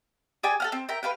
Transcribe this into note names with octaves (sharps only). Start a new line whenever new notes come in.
G#4 D5 G5 G#5
A4 F#5 F6
C4
A#4 E5 G5
B4 F5 G5